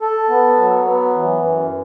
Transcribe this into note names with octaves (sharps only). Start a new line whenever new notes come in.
A4
B3
F#3
B3
E3
F#2